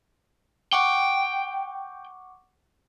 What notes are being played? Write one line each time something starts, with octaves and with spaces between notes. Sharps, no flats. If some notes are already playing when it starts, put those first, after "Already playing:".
F#5 G5 C#6 D6